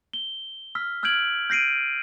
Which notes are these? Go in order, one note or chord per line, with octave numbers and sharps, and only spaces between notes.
G7
E6 F6 B6
E6 F6 G6 G#6 D7 F#7
G6 A#6 C7 D7 D#7